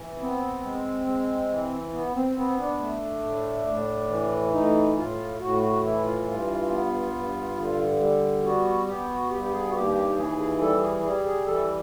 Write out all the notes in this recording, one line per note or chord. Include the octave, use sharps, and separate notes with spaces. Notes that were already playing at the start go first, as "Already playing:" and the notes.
Already playing: E3
B3 C4
G#3
G#3
E3
B3
C4
B3 C4
D4
A3
A2
A2
E3
A2 D#4
A2 F4
A2 F#4
F#4
E3 E4
F4
G2 F4
B3
G2
D3
G3
B3 F#4
B3 G4
F#4
G2 G4
G4
G#4
F#4
D#2 G4
G4
E3 G#4
G#4
G3 A4
G#4
G3 G#4
G#4
E3 A4